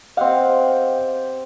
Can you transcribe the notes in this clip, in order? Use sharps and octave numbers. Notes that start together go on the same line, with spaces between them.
C4 G4 D#5 F5 F#5